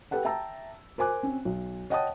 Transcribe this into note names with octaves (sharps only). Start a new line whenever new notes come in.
G4 A4 B4 F#5 G5
E5 G5 A5 A#5 E6
A#4 C5 G#5 D6 F#6
C4 C#4
B1
C#5 D#5 F#5 G5 A5 D#6